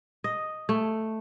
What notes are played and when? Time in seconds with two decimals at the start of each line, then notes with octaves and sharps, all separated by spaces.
0.24 D#5
0.69 A3